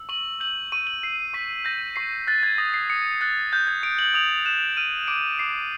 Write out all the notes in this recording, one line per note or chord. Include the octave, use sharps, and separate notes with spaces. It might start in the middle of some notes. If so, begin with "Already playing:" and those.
Already playing: E6
C#6 F#7
G6 F#7
C#6 D#7
F#7
E6 C7
C#6 B6
G6 A#6
C#6 C7
F#6 A6
G#6
D#6 A#6
C7
D#6 C#7
F#6 A6
F#6 G6
G#6
D#6 D7
F#7
D#6 F7
F#6 E7
F6 D#7
D6 D7
D6 C7